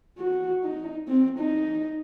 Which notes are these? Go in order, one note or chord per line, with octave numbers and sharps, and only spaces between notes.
F#4
D#4
C4
D#4